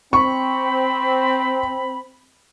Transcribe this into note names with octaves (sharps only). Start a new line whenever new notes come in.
C4 B5 C#6